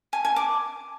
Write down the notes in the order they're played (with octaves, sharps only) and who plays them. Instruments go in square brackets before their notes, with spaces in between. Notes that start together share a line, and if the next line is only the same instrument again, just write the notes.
[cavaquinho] G#5
G#5
D6